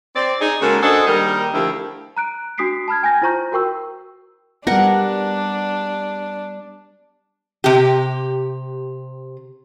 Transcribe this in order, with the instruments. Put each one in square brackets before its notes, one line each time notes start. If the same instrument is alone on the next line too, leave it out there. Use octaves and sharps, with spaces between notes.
[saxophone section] C4 D5
D#4 G#4
C#3 G#3 A#3 F#4 A4 A#4
D4 F#4 G#4 A4 C5 D#5
D#3 G3 A#3 D#4 A#4
D3 F3 A3 E4 G4 A#4
[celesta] A#5 F#6 D7
D4 F#4 D#6 B6 C7 D7
A5 B5 F6 G#6
G5 G#5 G6 A#6
E4 F4 C5 A#5 C#6 G6
F#4 A#4 G5 C#6 E6
[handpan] G3 B3 [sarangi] D4 [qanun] A#4 F#5
[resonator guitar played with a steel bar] C3 G4